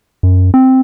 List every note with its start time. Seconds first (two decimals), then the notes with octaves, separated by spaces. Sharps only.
0.23 F#2
0.54 C4